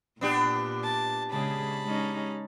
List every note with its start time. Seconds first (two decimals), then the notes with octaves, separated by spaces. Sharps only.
0.21 A#2 B3 D4 G4
0.83 A5
1.31 C#3 G#3 G#4 A5 B5
1.85 G#3 C#4 D#4